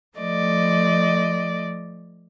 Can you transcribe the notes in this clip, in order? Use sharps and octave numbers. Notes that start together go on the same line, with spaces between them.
F3 A3 D5 D#5